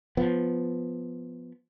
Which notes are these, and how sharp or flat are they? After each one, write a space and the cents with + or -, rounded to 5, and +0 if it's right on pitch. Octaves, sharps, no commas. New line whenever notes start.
F3 +0 B3 +0